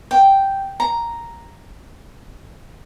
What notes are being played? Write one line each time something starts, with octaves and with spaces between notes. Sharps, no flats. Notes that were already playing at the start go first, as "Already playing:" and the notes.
G5
A#5